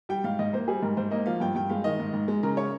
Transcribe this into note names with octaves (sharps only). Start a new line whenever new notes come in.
G3 G5
G#2 F5
G#2 D#5
A#3 C5
G3 G#4
G#2 A#4
G#2 C5
A#3 D#5
F3 F5
G2 G5
G2 G5
G#3 F5
D#3 D#5
G#2
G#2
G#3
C#3 A#4
C#5